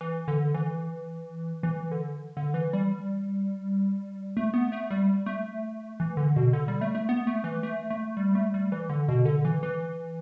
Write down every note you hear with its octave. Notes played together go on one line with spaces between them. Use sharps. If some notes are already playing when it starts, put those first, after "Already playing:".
E3
D3
E3
E3
D3
D3
E3
G3
A3
B3
A3
G3
A3
E3
D3
B2
D3
G3
A3
A3
B3
A3
E3
A3
A3
G3
A3
G3
E3
D3
B2
D3
E3
E3